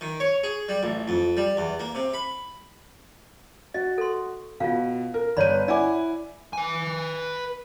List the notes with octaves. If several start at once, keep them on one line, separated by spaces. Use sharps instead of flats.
D#3
C#5
G#4
G3
A1
F2
G3
E2
A#3
C3
B5
F#4 D#5
A4 C6
B2 F4 F5
A#4
G1 B4 C#5 D5 B5 D#7
E4 D5 F#5 G#5 D6
B4 G#5